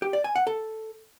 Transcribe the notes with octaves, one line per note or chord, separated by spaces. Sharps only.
G4
D5
G#5
F#5
A4